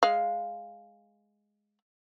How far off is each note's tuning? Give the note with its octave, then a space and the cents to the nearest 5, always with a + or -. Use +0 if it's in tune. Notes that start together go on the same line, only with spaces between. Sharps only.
G#3 +0 F5 +0